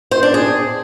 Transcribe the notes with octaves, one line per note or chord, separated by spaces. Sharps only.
C5
D4
G#4